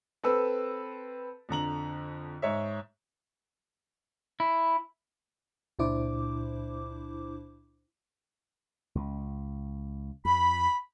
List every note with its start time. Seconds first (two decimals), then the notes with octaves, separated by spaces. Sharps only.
0.23 C4 A4 B4 E6
1.49 F2 D3 A#5 F#7
2.42 G#2 C#5 E5
4.40 E4
5.79 C#2 A#2 D4 E4 C5 D6
8.95 C#2
10.25 F2 B5